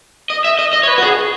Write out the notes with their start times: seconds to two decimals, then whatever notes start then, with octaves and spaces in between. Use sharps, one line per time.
0.30 D#5
0.44 E5
0.59 D#5
0.73 D#5
0.83 C#5
0.88 B4
0.98 F#4
1.02 G#4